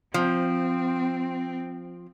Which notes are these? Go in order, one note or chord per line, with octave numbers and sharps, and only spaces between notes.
F3 C4